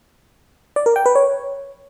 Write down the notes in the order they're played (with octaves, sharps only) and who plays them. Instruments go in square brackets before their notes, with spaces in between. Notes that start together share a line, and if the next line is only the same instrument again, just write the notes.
[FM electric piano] D5
A#4
G5
B4
C#5